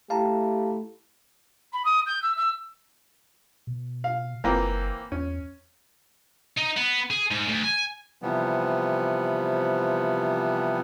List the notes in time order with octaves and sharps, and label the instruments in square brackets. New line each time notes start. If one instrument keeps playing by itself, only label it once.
[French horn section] A3 E4 G4 [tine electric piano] F5 A5 A#5
[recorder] B5
D#6
G6
E6
E6
[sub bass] B2
[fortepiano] F5
[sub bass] F#1 [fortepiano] E3 A#3 C4
[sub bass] E2 [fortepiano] C#4
[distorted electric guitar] D#4
B3
G#4
G#2
D2
G#5
[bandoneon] C3 E3 F3 G3 B3